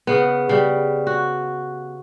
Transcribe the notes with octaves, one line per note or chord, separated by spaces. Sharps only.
C#3 B3
C#3 G3
F#4